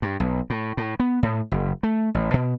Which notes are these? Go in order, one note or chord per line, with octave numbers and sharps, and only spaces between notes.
G2
B1
A2
A2
B3
A2
F#1
A3
A1
B2